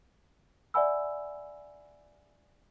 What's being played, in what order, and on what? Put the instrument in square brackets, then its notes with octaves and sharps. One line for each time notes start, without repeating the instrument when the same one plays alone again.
[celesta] D5 E5 F#5 G#5 B5 E6